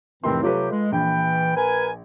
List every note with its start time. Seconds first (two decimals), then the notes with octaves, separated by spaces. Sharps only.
0.24 F1 A2 E3 C4 A#4 C6
0.43 C3 F#3 F4 G4 A4 B4
0.71 G#3
0.92 A#1 E3 G5
1.56 A#4 B4 G#5